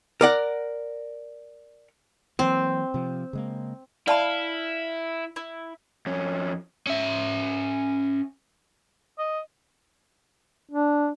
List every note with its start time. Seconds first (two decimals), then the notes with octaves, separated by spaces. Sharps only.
0.21 A#4 D5 F#5
2.39 E3 F#3 A#3 C4
2.94 C3 F3
3.33 C#3 G#3 A#3
4.08 E4 D5 F5 A5 B5
5.36 E4
6.06 F2 C#4
6.87 C#4 E5
9.19 D#5
10.71 D4